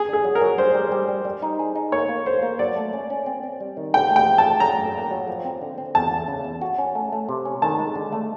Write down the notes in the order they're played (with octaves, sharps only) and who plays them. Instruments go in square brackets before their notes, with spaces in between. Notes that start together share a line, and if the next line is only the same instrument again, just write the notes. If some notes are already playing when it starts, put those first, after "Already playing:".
Already playing: [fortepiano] G#4
[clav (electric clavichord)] D3
[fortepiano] G#4
[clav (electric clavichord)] F#3
[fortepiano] A#4
[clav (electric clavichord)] F#3
[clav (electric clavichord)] G3 [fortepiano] C5
[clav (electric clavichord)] G3
G3
G3
G3
D#4
G#4
D#4
[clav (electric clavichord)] A#3 [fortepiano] C#5
[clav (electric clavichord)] A#3
[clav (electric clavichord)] A#3 [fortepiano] C5
[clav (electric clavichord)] A#3
[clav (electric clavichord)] F#3 [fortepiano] D5
[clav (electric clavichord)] A3
C#4
C#4
C4
C4
G3
D#3
[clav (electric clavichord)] C3 [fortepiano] G5
[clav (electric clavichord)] A3
[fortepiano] G5
[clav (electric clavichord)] F3
[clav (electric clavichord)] A3 [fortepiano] A5
[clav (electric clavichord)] F#3 [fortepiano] A#5
[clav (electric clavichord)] F#2
A#3
F#3
F3
C4
D3
C4
[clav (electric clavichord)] E2 [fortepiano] A5
[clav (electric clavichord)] E2
C#3
E2
F#4
C#4
A3
A3
C3
C#4
[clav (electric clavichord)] D#3 [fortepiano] A5
[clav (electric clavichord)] G#3
D3
A3